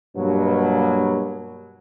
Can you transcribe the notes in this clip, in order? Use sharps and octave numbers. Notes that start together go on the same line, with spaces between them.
G2 B2 F#3 A#3